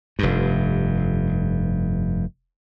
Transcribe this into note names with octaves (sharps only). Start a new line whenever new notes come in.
F1 G2